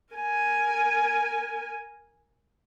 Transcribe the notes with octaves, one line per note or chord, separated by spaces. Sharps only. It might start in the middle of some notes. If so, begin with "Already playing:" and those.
A#4 G#5